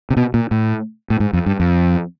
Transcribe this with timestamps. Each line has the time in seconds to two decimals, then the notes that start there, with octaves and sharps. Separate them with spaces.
0.10 C3
0.17 B2
0.34 A#2
0.51 A2
1.10 A2
1.20 G#2
1.33 F2
1.46 G2
1.60 F2